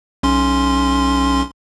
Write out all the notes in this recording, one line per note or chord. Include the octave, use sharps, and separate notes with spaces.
B1 C#4 C6